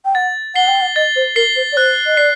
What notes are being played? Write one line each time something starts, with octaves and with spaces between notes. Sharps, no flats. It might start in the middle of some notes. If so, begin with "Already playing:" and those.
G5
F#5 A6
F#5 C7 G7
G5
F#5
D#5 A6
C5
A#4 C7 G7
C5
D5
C5 F#6
D#5
D5 C7